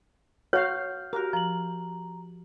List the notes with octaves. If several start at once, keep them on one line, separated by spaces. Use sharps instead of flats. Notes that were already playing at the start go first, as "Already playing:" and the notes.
F#4 C#5 F5 F6 G6
F#4 G4 A#4
F3 A#5 F#7